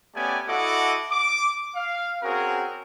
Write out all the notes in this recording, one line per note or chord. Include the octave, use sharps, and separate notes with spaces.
A3 B3 C#4 G4 D5 G#5
E4 F#4 A4 D#5 F#5 D6
D6
F5
C4 C#4 F#4 G#4 A#4